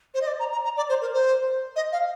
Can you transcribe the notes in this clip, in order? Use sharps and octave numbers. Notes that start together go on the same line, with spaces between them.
C5
D#5
D5
A#5
A#5
A#5
D5
C5
A#4
C5
D#5
F5